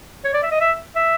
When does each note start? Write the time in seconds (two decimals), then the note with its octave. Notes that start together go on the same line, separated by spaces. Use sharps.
0.25 C#5
0.34 D5
0.43 E5
0.51 D#5
0.61 E5
0.96 E5